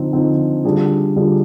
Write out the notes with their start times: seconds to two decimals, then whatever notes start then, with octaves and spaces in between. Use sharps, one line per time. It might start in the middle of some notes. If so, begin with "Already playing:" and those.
Already playing: D3 F3 C4 D#4
0.13 D3 F3 C4 D#4
0.65 D3 G3 D4 F4 G#4
1.16 D3 G3 D4 F4 G#4